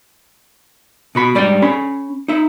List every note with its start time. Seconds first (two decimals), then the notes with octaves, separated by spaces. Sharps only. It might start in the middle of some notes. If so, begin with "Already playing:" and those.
1.15 B2 F#4 B5
1.35 G#2 G3 D5 G5
1.62 C#4 B5
2.28 D#4 E5